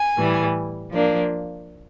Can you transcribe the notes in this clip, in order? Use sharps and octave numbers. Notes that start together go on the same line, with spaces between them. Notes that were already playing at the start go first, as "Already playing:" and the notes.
Already playing: G#5
A2 E3 G3
F3 A#3 D4